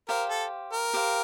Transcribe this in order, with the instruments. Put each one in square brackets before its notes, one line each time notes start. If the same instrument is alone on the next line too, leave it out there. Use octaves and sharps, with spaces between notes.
[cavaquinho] G4 C5 F5 [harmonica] A#4
[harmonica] A4
A#4
[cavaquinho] G4 C5 F5